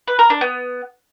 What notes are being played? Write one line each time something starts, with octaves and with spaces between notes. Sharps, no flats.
B4
A#4
D4
B3